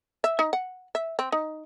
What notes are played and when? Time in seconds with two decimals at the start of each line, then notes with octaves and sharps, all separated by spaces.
0.24 E5
0.39 D#4
0.53 F#5
0.95 E5
1.19 C4
1.32 D#4